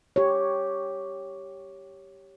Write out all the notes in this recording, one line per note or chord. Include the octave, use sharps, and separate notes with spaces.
G4 C#5